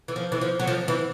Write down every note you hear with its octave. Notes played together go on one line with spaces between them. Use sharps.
E3
F3
E3
F3
F#3
F3
E3